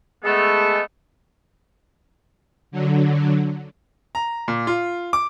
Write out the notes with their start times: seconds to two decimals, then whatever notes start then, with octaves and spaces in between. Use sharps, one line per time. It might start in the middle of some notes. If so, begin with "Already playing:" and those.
0.25 G#3 A3 B3 A4
2.71 D3 F#3
4.15 A#5
4.48 A#2
4.67 F4
5.13 D6